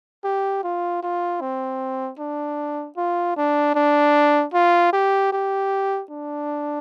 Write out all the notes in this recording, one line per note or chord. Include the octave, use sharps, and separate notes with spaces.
G4
F4
F4
C4
D4
F4
D4
D4
F4
G4
G4
D4